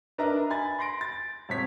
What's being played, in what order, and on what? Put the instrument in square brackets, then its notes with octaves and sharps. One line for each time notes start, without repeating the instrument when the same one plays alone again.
[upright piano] D4 A#4 B4 D#5 E5 A#5
G#5 B5 A6
B5 C6 A#6 D7
A6
D#1 C4 C#5 B6